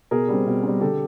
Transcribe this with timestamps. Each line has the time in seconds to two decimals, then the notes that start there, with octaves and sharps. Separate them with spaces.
0.11 B2 G#4 A#4
0.28 G3 C4
0.46 B2
0.63 G3 C4
0.80 D3 G4 A4